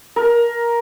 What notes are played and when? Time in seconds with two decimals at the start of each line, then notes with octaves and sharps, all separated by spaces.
0.16 A#4